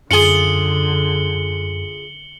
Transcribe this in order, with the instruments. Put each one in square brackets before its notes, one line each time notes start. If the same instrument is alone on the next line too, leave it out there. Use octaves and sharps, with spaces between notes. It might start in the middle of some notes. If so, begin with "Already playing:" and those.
[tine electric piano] F#2 [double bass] D3 [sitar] F4 G#4 [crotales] C#7 F#7 G7